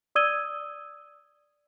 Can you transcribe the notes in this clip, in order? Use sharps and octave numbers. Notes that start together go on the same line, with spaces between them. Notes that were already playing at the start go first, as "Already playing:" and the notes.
D5 D#6 E6 G#6 D#7 G7